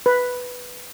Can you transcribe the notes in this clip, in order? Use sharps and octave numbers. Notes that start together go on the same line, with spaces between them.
B4